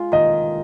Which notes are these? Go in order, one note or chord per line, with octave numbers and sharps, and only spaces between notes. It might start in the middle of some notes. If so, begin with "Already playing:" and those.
Already playing: G#3 F4
D#3 D#5